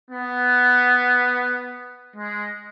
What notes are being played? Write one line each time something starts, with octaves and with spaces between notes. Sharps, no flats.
B3
G#3